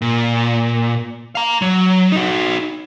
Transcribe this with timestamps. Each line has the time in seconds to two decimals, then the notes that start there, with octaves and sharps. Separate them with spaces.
0.02 A#2
1.35 F5 A#5
1.62 F#3
2.12 D#4 F#4